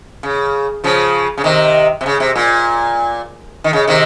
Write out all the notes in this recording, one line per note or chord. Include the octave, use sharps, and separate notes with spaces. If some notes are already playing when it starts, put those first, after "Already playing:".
C#3
C#3 F3
C#3
C3 D#3
C3
C#3
C3
A#2
D#3
C#3
C3 D#3